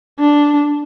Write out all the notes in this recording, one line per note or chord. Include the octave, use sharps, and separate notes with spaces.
D4